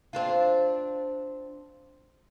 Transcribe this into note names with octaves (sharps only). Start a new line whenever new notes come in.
C4 D4 F4